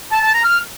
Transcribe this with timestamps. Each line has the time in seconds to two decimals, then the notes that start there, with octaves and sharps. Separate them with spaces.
0.12 A5
0.23 A5
0.33 A#5
0.44 F6